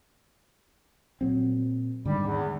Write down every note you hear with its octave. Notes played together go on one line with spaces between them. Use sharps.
A#2 F#3 C4
G#2 D3 D#3 G3
E2